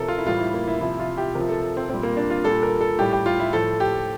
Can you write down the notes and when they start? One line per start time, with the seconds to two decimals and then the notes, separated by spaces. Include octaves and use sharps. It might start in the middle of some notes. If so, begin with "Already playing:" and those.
Already playing: C3 F3 A4 A#4
0.08 F4
0.18 E4
0.26 A2 E3 G3 F4
0.40 E4
0.54 A#3
0.68 E4
0.81 C3 F3 E4
0.99 F4
1.17 G4
1.35 C3 F3 A#4
1.49 A4
1.77 C4
1.89 A#2 G3 C4
2.03 A#3
2.17 D4
2.30 F4
2.44 A#2 G3 A4
2.63 A#4
2.81 A4
2.98 A2 G3 G4
3.13 G4
3.26 F4
3.40 E4
3.53 A2 F3 A4
3.80 G4